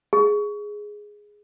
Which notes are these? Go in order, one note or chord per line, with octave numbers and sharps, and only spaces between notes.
G#4